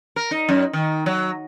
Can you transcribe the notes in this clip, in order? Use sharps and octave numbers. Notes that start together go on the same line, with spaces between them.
A#4
D#4
F#2
D#3
F#3